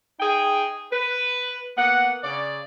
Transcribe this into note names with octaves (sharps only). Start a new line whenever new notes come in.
D#4 G#4 G5
B4
A#3 B3 F#5
C#3 D5